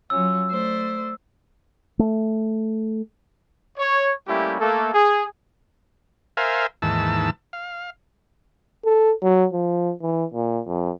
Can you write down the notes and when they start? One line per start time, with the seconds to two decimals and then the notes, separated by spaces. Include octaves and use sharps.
0.10 F#3 C#4 F4 E6
0.49 A3 C5 D5
1.99 A3
3.78 C#5
4.28 G3 A3 A#3 C#4 E4 G4
4.61 A3 A#3 A4
4.93 G#4
6.37 A#4 C5 E5 F5 G#5
6.82 D#2 G#2 E3 A5 E6
7.53 F5
8.85 A4
9.22 F#3
9.53 F3
10.02 E3
10.34 A#2
10.67 F2